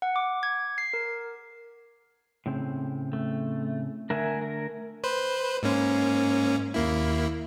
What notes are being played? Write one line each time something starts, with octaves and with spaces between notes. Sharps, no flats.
F#5
D6
G#6
C7
A#4
A2 C#3 C4
A3
D3 A3 D4 A#4 E5 G#5
A#4
B4 C5
G#2 A#3 C#4
D#2 A#3 E4